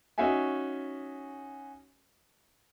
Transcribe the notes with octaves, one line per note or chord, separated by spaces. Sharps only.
C#4 D#4 F#4 E5 G#5